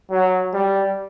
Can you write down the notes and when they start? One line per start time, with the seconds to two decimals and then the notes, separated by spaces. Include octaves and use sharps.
0.11 F#3
0.53 G3